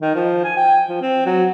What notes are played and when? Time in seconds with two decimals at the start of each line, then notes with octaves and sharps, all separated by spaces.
0.02 D#3
0.15 F3
0.44 G#5
0.57 G5
0.89 F3
1.01 C4
1.26 F#3